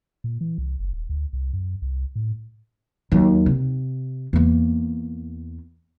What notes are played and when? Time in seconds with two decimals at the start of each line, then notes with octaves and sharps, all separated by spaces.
0.24 A#2
0.41 E3
0.58 C2
0.79 F#1
0.93 D#1
1.09 D2
1.33 C2
1.53 F#2
1.82 C2
2.16 A2
3.12 D#2 F#3
3.46 C3
4.33 E2 A#3